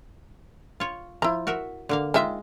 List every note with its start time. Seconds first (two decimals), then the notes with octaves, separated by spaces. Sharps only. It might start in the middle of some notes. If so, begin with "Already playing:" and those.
0.80 F4 C#5
1.22 F3 E4 A#5
1.47 F#4 A#4 E5
1.89 D3 A#3 F5
2.14 D#3 G#3 F4 E5